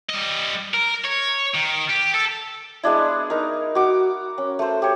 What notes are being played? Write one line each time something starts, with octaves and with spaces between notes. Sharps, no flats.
G3 D#5
A#4
C#5
D#3
G4
A4
G#3 B3 D4 E4
D#4 A#4
F#4 D6
C#4
A3 C5
G4 C#5